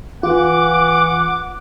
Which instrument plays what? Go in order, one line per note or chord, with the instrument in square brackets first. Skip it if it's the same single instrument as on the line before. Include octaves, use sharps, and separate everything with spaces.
[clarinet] E3 [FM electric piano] F4 [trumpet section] F#5 [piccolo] D6